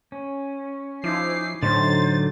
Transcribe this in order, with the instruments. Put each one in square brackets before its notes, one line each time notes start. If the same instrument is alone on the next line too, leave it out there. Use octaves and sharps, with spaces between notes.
[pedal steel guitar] C#4
[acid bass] F3 [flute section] D#4 E4 D6 [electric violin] C7
[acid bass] A2 [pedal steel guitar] D3 F#3 D#4 [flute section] C5 C6 [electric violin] A6